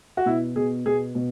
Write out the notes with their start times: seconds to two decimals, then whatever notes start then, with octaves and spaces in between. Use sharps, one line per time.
0.17 F#4
0.26 B2 E4
0.56 B2 G#4
0.86 B2 G#4
1.15 B2